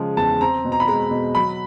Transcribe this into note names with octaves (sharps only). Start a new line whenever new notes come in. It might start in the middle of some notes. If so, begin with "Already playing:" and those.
Already playing: C#3 F3 G#3
E2 A5
C4 A#5
B2
A#5
B5
G#3 A#5
B2
F#3 B5